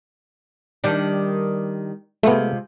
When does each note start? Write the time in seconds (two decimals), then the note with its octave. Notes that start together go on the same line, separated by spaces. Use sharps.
0.84 D#3 G3 D4
2.23 C3 G#3 A3 B3 F4